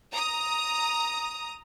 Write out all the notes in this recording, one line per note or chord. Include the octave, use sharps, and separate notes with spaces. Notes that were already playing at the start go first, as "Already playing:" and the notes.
A#5 D#6